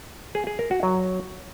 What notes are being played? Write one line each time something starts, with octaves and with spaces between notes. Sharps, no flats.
G#4
G#4
A#4
F#4
F#3